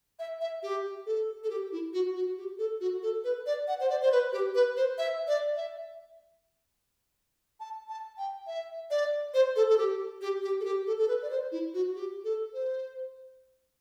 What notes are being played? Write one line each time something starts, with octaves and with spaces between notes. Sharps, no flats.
E5
E5
G4
A4
A4
G4
E4
F#4
F#4
G4
A4
F#4
A4
B4
D5
F#5
C5
D5
C5
B4
G4
B4
C5
E5
D5
E5
A5
A5
G5
E5
D5
C5
A4
A4
G4
G4
G4
A4
G4
A4
A4
B4
D5
C5
E4
F#4
G4
A4
C5